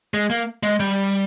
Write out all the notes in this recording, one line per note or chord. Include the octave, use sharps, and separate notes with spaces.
G#3
A#3
G#3
G3